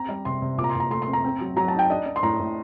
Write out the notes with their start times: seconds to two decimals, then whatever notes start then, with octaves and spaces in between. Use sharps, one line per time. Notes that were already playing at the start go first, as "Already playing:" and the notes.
Already playing: C4 A#5
0.09 G3
0.25 C3 C6
0.42 C3
0.58 A#2 D6
0.64 A#5
0.69 C6
0.75 A#2 A#5
0.91 A3 C6
1.02 C6
1.07 C4
1.13 A#5
1.25 C4
1.41 F#3
1.56 F#3 A#5
1.68 D#4 A5
1.79 G5
1.90 D4 D#5
2.06 D4
2.16 C6
2.23 A2 A#5
2.39 A2